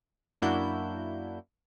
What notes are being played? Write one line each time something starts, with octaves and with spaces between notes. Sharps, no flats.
F#2 A#3 D4 E4 F#4 G6